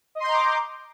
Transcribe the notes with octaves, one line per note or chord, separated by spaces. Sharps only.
D#5 A#5 C6 D6 G6